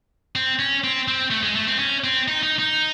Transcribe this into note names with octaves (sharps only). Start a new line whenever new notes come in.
C4
C#4
C4
C4
A3
G#3
A3
C4
C#4
C4
D#4
D#4
D#4